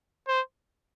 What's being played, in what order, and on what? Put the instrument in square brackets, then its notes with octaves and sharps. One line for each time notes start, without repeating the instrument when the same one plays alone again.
[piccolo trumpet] C5